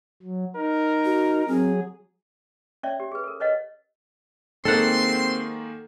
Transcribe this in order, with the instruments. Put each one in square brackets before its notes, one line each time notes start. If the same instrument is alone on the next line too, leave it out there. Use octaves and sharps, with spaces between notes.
[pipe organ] F#3
[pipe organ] D#4 [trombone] A#4
[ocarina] F#4
[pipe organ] F#3 G#4 [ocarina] C4
[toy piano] C#4 C#5 D5 E5
G4
G#4 B4
A4 A#4
B4 C#5 D#5 F#5
[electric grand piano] D#3 G#3 A#3 [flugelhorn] C4 [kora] A4 F#5 [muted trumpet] C6